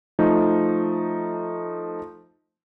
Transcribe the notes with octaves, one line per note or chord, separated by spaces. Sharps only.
F3 A3 D#4